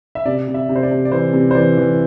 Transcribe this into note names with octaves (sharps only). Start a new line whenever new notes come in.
E5
C3 D5
C3
E5
C3
C5
D5
C3
D5
E3 C5
C3
C5
E3 D5
E3